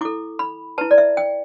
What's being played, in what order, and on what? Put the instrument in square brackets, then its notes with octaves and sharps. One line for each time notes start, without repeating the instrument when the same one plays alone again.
[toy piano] E4 A4 D6
B5
E4 B4 A5
D5
E5
G5